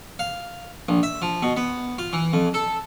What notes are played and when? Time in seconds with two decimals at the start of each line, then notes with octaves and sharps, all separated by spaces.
0.19 F5
0.89 A#1
1.03 E5
1.22 F3
1.42 B2
1.57 B3
1.98 F4
2.13 E3
2.33 F2
2.54 A4